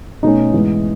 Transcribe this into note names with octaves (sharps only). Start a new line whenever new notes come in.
B2 A3 C#4 D#4
G#2 E3 B3